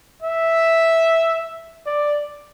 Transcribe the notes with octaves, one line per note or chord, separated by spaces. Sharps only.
E5
D5